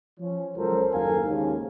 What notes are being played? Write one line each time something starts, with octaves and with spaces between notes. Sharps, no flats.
F3 C#4
C#2 F3 F#3 A4 A#4 C5
F#1 D#2 A4 A#4 F5 G#5
D#2 G#2 C#3